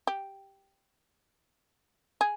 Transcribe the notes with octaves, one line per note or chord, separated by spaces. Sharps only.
G4
G#4